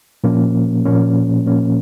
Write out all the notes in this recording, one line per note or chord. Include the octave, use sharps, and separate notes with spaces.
A#2 F3 A#3 C#4
A#2 F3 A#3 C#4
A#2 F3 A#3 C#4